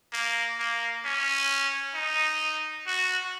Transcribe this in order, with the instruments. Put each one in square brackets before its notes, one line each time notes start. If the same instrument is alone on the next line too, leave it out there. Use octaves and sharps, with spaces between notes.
[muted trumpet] A#3
A#3
C#4
D#4
F#4